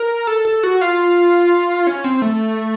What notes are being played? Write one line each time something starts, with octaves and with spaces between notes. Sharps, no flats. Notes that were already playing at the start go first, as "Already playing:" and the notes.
Already playing: A#4
A4
A4
F#4
F4
C#4
C4
A3